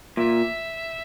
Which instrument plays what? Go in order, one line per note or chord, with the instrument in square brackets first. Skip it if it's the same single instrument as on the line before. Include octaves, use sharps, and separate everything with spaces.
[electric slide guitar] A#2 [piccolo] E5